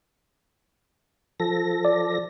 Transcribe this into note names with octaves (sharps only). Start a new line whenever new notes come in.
F3 A4 A#6
D5